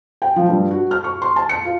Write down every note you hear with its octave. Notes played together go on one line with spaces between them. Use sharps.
G5
F3
G2
F#4
F6
C#6
C6
A5
C#7
F4